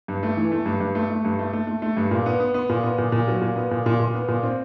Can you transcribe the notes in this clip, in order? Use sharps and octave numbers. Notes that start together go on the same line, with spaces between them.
G2
A3
E3
A3
G2
G2
A3
A3
G2
A3
A3
A3
A3
G2
A#2
B3
B3
B3
A#2
B3
A#2
A#2
F#3
A#2
B3
A#2
A#2
A#2
B3
A#2
C4